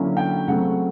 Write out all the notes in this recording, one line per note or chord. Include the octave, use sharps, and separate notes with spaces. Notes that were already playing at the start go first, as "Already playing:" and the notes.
Already playing: D3 F#3 A#3 C#4 E4
G5
C#3 F#3 A3 C4 F#5